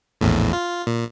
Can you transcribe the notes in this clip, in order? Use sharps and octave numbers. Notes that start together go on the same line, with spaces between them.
A#1 E2 A2
F4
A#2